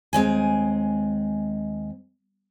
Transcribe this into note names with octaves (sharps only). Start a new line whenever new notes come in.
D#2 G#3 C4 G#5